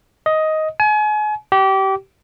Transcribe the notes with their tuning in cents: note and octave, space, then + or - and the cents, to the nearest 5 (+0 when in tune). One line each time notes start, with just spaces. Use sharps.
D#5 +10
G#5 +35
G4 -25